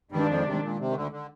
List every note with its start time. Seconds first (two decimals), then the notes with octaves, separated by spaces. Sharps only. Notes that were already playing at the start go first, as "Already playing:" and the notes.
0.11 G2 D#3 G3 G#3 D4
0.28 F2 F3
0.45 C3
0.63 A#2
0.79 C3
0.90 D#3
0.96 D2 D3
1.12 D3